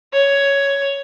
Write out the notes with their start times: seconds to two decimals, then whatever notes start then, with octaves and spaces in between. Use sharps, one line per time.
0.13 C#5